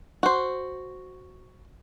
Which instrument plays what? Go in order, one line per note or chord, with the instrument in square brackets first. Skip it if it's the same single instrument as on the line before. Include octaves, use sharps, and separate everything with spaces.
[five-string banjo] F#4 C5